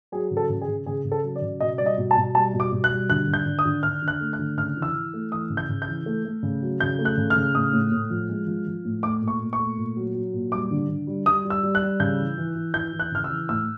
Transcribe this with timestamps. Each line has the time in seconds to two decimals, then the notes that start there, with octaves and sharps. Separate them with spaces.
0.12 F#3 G#4
0.31 C#3
0.37 A4
0.49 C#3
0.61 G#4
0.68 C#3
0.86 C#3 G#4
1.04 C#3
1.12 A4
1.23 F#3
1.36 D5
1.42 C#3
1.60 B2 D#5
1.78 G3 D5
1.86 D#5
1.98 B2
2.11 A5
2.17 B2
2.35 G3 A5
2.53 B2
2.60 D6
2.72 B2
2.84 F#6
2.90 G3
3.09 D3 F#6
3.28 D3
3.33 G6
3.46 D3
3.59 D#6
3.65 D3
3.83 D3 F6
4.02 D3
4.08 F#6
4.21 A3
4.33 F#6
4.39 D3
4.57 C#3 F6
4.76 E3
4.82 E6
4.95 E3
5.14 A3
5.32 E3 D#6
5.50 C#3
5.57 G6
5.69 C#3
5.82 G6
5.88 E3
6.06 A3
6.25 A3
6.43 C#3
6.62 F#3
6.80 C#3 G6
6.99 A3
7.05 F#6
7.17 C#3
7.30 F6
7.36 C#3
7.55 A2 D#6
7.73 A2
7.92 A2
8.10 F3
8.30 G#3
8.47 F3
8.67 F3
8.85 A2
9.03 A3 D6
9.21 A#2
9.28 C#6
9.41 A#2
9.53 C#6
9.59 A3
9.77 A#2
9.97 F#3
10.15 F#3
10.33 A#2
10.52 G3 D6
10.71 D3
10.89 D3
11.07 G3
11.26 G3 D#6
11.45 G3
11.50 E6
11.63 G3
11.75 F#6
11.82 G3
12.00 C#3 G6
12.19 E3
12.38 E3
12.55 E3
12.74 E3 G6
12.93 E3
12.99 F#6
13.12 C#3 F6
13.24 E6
13.30 E3
13.49 A2 E6